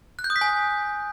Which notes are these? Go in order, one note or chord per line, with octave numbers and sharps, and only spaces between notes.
F#6
G6
D#6
B6
G#5